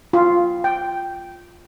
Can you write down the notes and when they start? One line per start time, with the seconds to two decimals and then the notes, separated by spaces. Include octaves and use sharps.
0.13 F4
0.64 G5